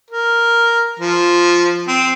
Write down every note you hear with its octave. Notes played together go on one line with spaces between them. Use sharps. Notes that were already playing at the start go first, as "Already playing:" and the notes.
A#4
F3
C4